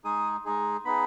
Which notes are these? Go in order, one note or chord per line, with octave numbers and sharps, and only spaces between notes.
G#3 D#4 G#4 D#6
G#3 D#4 G#4
B3 D#4 G#4 B5